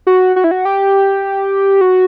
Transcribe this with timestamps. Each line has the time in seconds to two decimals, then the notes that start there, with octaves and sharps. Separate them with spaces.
0.07 F#4
0.36 F#4
0.44 E4
0.51 F#4
0.65 G4
1.81 F#4